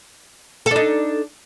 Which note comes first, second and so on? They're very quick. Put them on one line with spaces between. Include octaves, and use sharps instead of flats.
A4 D4 D#4